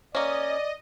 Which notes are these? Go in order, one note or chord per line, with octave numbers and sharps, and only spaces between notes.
A#3 C#4 D5 D#5